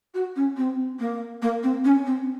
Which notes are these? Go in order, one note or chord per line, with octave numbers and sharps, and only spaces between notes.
F#4
C#4
C4
A#3
A#3
C4
C#4
C4